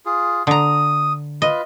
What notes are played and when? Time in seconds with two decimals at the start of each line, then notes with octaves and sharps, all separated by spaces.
0.06 F4 G#4
0.47 D3 A#5 D#6
1.42 F4 B4 D#5